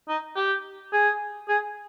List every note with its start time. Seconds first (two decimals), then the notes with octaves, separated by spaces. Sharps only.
0.09 D#4
0.36 G4
0.93 G#4
1.49 G#4